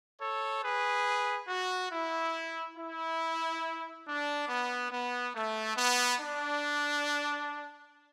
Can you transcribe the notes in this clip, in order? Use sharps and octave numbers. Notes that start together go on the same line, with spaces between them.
A4 C#5
G#4 B4
F#4
E4
E4
D4
B3
B3
A3
B3
D4